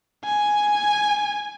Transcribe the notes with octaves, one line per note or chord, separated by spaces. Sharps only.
G#5